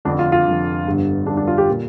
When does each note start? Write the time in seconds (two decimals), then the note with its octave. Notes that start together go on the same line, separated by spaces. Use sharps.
0.05 F1 F2 D3 D4
0.19 F4
0.32 F4
0.46 F1 F2 D3
0.87 G1 G2 D3
1.26 G1 G2 D3 D4
1.37 D4
1.47 F4
1.58 G4
1.70 A#2